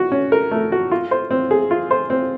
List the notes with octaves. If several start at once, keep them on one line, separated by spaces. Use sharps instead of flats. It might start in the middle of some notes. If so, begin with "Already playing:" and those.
Already playing: F#4
C#4
A#4
A3
F#4
F4
C5
C4
G#4
F4
C5
C4